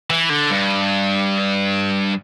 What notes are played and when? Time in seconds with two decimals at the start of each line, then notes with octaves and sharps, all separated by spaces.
0.10 E3
0.30 D3
0.51 G2